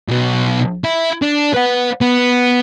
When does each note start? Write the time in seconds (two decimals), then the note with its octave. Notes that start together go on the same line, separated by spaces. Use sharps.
0.08 B1 B2
0.84 E4
1.22 D4
1.54 B4 F#5
2.01 B3